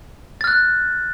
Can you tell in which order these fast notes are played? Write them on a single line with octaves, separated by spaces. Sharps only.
A6 F6 F#6